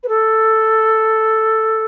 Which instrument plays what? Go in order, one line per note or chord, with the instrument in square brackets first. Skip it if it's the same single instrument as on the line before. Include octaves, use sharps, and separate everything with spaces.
[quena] B4
A4